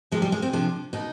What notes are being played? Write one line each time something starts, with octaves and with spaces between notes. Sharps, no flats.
C3 F3 G#3
G3
G#3
C4
C3 F3 D4
B2 D#4